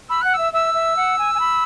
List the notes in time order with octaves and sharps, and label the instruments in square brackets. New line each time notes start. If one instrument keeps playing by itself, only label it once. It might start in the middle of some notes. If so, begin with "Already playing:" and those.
[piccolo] B5 [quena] E6
[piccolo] F#5 [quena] F#6
[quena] E6
[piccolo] E5
[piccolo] E5 [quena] E6
[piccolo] E5
F#5
G#5
G#5
B5